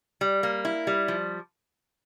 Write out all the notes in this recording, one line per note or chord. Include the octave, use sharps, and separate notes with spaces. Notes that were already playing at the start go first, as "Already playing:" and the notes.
G3
A#3
E4
G3
F3